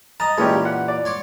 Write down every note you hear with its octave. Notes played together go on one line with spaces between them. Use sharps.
D#5 A5 A#5
A#2 E3 G#3 C#4 G4
F#5
D5
C#5 C6 D6